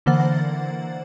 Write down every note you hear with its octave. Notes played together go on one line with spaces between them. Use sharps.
D3 E3 A#3 C5 F#5 A6